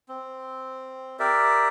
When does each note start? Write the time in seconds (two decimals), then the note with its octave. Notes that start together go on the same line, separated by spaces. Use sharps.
0.09 C4
1.19 G4 A#4 D5 E5